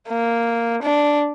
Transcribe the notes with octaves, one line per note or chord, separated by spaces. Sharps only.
A#3
D4